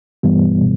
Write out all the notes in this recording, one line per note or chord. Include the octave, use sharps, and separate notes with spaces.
G2 E3 G3 B3